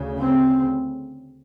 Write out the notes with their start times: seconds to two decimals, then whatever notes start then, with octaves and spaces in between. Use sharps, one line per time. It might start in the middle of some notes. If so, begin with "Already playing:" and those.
Already playing: D2 C#3
0.19 C4